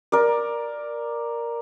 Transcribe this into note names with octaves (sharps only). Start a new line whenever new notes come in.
A#4 D5